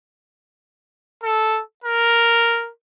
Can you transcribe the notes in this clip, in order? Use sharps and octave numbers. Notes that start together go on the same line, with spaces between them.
A4
A#4